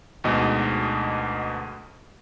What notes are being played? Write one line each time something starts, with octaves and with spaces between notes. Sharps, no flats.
D2 G#2 B2 D#5